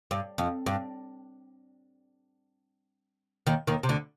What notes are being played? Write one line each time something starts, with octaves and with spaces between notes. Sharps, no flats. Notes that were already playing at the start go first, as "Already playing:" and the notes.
G2
F2
G2
D#2 D#3
D#2 D#3
C3
D2 D3